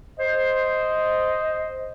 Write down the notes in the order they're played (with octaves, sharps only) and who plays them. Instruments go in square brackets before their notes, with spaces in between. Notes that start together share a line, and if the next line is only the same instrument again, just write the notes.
[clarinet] C5 [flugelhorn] D#5